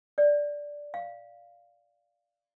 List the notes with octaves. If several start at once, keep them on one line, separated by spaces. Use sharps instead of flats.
D5
F5